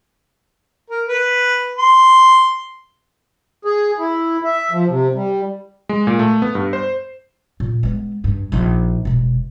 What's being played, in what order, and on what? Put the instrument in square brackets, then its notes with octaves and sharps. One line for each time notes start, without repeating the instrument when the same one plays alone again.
[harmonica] A#4
B4
C6
[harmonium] G#4
E4
E5
F3
C3
G3
[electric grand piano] G#3
A#2
A3
B3
G2
C5
[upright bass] A#2
G#3 B3
G2
A#1 D#4
E1 B2